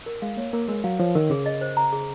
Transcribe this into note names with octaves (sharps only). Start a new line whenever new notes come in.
A#4
G#3 F5
A#3 C#5
A#3 A#4
G#3 A#4
F#3 F5
F3 C#5
D#3 A#4
C#3 G#4
D#5
C5
A#5
G#4